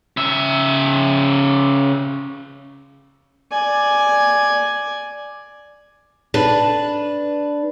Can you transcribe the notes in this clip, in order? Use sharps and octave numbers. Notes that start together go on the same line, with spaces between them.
C#3 E5
D5 G#5
D4 B4